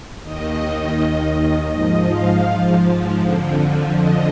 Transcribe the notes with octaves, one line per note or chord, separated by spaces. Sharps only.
D#2 D#3 D#5
G#2 F3 D#5
F5
F2 D3 F3
D#5